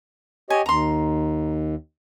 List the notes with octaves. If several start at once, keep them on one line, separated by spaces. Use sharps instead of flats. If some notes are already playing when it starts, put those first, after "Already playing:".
G4 C#5 D#5 G#5
D#2 A#5 C6